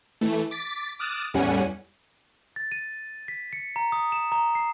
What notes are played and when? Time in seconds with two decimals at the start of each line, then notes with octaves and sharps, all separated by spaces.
0.21 E3 A3
0.51 D6 A6 B6
0.99 D6 D#6 F6 F#6 A6 E7
1.34 E2 A2 G3 C#4 F#5 G#5
2.56 A6
2.72 D#7
3.28 B6
3.53 C#7
3.76 A#5
3.92 D#6
4.12 E7
4.32 A#5
4.55 C7